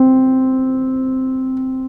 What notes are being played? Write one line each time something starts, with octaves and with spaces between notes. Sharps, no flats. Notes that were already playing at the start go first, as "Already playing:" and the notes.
Already playing: C4